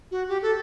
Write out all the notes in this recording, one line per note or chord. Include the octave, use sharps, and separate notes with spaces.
F#4
G4
A4